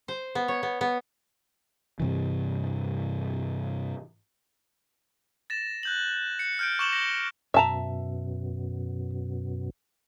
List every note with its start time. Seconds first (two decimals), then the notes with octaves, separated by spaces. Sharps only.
0.08 C5
0.35 B3
0.48 C#5
0.63 B3
0.81 B3
2.00 G2 C3 E3
5.50 A6 A#6 E7
5.83 F#6 G6 F#7
6.39 C#7
6.59 F6 G6 D7
6.79 C#6 D6 E7 F#7 G7
6.93 C#6 A#6
7.54 F#2 B2 E5 A5 A#5